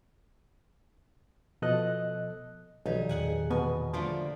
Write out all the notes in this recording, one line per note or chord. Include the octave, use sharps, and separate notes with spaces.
B2 F3 A4 D#5 F#6
B1 D#3 F3 G3 D#4
E2 A#2 D#3 G#4 F#5 G#5
B2 B3 G#5
D3 F3 A3 A#3 F4